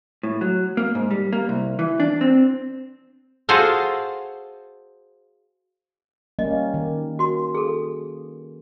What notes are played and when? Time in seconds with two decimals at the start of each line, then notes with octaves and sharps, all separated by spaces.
0.23 A2
0.41 F#3
0.77 A#3
0.95 G#2
1.10 G3
1.33 A#3
1.49 C2
1.79 E3
2.00 D4
2.21 C4
3.49 F4 F#4 G#4 A4 C5 F5
6.39 G3 A#3 C#4 D#5
6.74 D#3
7.19 F#4 C6
7.55 G#4 A4